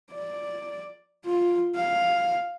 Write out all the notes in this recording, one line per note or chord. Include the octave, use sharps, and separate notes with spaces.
D5
F4
F5